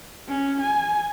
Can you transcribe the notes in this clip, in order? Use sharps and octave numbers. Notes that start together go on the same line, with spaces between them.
C#4
G#5